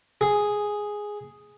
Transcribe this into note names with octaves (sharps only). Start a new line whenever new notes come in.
G#4